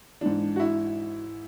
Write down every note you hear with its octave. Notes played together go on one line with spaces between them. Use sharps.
G#2 E3 D4
F#4
E4